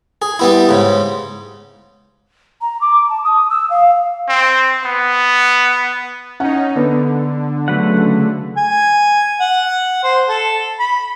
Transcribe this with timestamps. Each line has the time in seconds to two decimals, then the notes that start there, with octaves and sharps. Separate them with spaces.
0.22 G#4
0.39 G3 B3 E4
0.69 G#2 C#3
2.61 A#5
2.81 D6
3.10 A5
3.24 D#6
3.50 E6
3.70 F5
4.28 C4
4.84 B3
6.40 C#4 D#4 F#5
6.76 D3 B3
7.68 C#3 F#3 A3 B4 F#5
8.57 G#5
9.41 F#5
10.03 C5
10.29 A4
10.79 B5